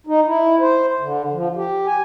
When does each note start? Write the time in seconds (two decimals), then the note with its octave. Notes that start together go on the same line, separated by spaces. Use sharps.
0.07 D#4
0.27 E4
0.60 C5
1.00 D3
1.33 F3
1.56 G4
1.87 G#5